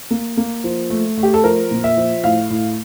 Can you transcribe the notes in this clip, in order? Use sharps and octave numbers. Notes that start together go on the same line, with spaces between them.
A#3
A#3
F3
A3
A3
G4
A4
F3 A#4
A#2
E5
F3
A2 F5
A2